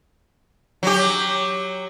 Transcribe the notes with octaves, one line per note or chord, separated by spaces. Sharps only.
F#3 G4